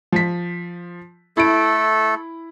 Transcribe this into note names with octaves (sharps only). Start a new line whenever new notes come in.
F3 B6
A3 E4 A4 D7